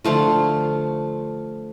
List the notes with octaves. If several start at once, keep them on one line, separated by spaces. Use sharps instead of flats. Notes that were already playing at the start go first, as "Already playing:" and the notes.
D3 F3 A3 F4